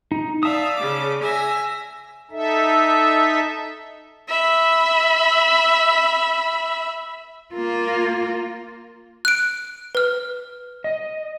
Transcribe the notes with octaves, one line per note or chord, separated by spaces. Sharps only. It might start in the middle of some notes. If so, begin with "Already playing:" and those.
D#4
D5 E5 F5 A5 D#6
C#3 D6
E5 G#5 A#6
D#4 A4 E5
E5 B5
A#3 F4
F#6 D7
B4 F6
D#5